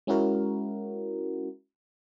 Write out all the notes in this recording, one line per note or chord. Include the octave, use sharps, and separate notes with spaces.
G#3 C#4 E4 F#4 A#4